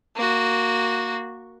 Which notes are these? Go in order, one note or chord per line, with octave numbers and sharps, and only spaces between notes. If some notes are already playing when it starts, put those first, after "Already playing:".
A#3 F#4